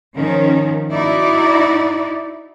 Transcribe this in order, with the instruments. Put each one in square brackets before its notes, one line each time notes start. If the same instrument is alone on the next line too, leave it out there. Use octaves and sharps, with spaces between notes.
[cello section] D#3 F3 C#4
D#4 E4 F#4 D5